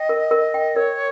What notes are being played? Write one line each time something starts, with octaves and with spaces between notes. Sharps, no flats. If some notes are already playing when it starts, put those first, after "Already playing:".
Already playing: D#5 G5
A#4
A#4
G5
A#4 C#5